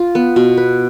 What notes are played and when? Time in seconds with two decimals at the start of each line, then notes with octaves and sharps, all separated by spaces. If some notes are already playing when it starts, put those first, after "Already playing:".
Already playing: F4
0.15 B3
0.36 B2
0.57 B4